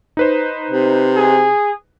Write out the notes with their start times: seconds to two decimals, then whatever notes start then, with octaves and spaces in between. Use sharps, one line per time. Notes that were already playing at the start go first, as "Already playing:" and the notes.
0.17 D#4 B4 C5
0.70 C3
1.17 G#4